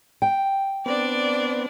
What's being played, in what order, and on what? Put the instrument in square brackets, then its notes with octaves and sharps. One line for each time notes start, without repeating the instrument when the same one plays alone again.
[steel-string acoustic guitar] G5
[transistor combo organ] B3 C4 [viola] D4 D5